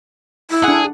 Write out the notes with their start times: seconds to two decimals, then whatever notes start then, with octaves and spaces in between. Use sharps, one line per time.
0.51 E4
0.64 D4 G#4 F#5